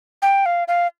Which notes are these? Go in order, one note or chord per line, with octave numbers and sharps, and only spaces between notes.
G5
F5
F5